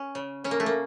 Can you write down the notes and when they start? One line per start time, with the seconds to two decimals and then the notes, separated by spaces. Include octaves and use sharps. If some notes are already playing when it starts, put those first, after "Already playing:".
Already playing: C#4
0.15 C#3
0.44 C#3 C#4
0.51 A#3
0.60 A3
0.66 A#3